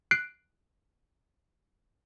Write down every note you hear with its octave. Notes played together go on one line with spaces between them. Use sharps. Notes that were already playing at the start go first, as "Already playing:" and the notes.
F#6 C7 D7